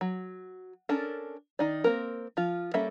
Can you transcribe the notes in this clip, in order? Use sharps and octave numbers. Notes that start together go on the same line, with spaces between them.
F#3
C#4 D4 A4 A#4
D#3 D#4 D5
A#3 C4 A#4
F3 F4
G3 A#3 C#4 A4 E5